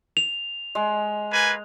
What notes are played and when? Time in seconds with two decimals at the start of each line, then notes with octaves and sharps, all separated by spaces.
0.17 F7
0.75 G#3
1.31 A#3 B4 G#5